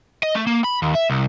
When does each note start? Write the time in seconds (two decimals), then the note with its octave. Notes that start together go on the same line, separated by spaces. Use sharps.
0.23 D#5
0.35 A3
0.47 A#3
0.64 B5
0.82 D#2
0.95 E5
1.10 C2